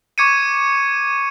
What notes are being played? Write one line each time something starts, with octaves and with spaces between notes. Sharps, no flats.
C#6 D6 G#6 C#7 D#7